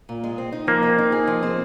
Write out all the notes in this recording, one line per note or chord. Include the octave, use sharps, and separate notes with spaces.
A#2
G#3
C4
D#4
F3 A#3
C4
D#4
G#4
F3
C4